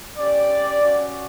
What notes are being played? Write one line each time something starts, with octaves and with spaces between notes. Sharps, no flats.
C#4 G4 D5
C#4 F#4